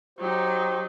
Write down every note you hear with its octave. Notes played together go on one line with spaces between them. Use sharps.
F#3 D#4 G4 C5